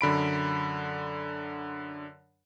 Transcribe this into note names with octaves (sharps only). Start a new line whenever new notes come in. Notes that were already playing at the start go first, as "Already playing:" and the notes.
F#2 D3 B5 D7